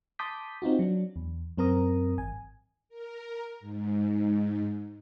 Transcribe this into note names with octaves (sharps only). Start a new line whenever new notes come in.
A5 C6 D6 D#6 G6 B6
C4 D#4 F4 F#4
F#3 D4
E2
F#2 C4 A#4 A#5 D#6
G#1 G#5
A#4
G#2